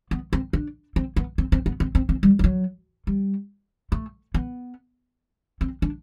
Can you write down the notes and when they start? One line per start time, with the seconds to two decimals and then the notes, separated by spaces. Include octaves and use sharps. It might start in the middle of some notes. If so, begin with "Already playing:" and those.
0.11 B3
0.33 C4
0.53 D4
0.96 C4
1.16 B3
1.38 C4
1.52 C4
1.66 B3
1.80 C4
1.95 C4
2.09 C4
2.23 G3
2.39 G3
2.44 F#3
3.07 G3
3.92 A3
4.34 B3
5.61 C4
5.82 D4